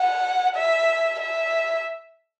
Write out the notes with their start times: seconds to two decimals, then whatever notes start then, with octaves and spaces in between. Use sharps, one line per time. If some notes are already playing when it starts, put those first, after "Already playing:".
Already playing: F#5
0.56 E5
1.21 E5